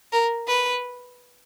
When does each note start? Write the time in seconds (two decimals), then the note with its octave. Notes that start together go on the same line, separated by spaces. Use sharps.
0.12 A#4
0.47 B4